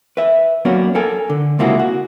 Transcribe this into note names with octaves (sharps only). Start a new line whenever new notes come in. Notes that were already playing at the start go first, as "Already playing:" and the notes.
B4 E5
F#3 A#3 B3 C#4 D4 F#4
A4 A#4 G#5
D3
C#2 C3 A#3 E4 F#4 G#4
F#4